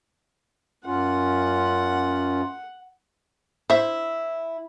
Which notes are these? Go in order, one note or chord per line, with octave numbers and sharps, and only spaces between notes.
F#2 C#4 F4 F#5
E4 C5 E5